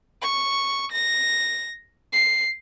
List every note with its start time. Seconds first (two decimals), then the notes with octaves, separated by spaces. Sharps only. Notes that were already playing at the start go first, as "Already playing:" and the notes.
0.22 C#6
0.92 A#6
2.13 C7